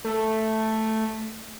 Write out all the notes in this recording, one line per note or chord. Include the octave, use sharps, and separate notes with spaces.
A3